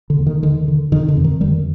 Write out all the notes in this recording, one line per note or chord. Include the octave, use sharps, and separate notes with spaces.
D3
D#2
D#3
D3 D#3
D3
F2 D#3
D3
F2
D#3
D3 D#3 G3